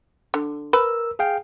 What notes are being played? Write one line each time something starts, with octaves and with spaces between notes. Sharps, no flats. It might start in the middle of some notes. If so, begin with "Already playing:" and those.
D3
A#4 B4 E6
G#4 F5 G5